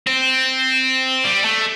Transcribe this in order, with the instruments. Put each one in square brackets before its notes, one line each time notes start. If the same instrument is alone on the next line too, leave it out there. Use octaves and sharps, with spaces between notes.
[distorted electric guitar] C4
G3
A3